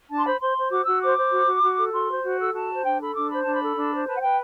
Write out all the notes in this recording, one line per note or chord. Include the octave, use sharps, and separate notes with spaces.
D4 A5
C6
C5 B5
C5 C6
C5
F#4 D6
F#4 E6
C5 D6
C5
F#4
F#4
F#4
A4
F#4 C6
C5
F#4
A4 E6
F#4 A5
C5
D4 G5
A4 B5
D4 D6
C5 B5
D4 A5
B5
A4
D4
C5
B4 A5
F#5
B4 G5